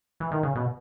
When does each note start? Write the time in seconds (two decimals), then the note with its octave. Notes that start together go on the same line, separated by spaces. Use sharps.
0.20 E3
0.32 D#3
0.43 C#3
0.55 B2